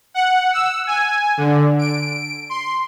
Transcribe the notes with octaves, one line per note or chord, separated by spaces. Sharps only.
F#5
E6
G#5
D3
D7
C6